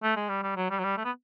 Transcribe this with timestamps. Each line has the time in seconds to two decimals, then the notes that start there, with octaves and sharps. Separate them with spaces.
0.03 A3
0.17 G#3
0.29 G3
0.43 G3
0.56 F#3
0.70 G3
0.79 F#3
0.84 G3
0.97 A3
1.05 B3